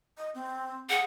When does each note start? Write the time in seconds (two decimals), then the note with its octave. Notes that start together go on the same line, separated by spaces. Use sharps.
0.18 D#5
0.35 C4
0.90 G#4 F#5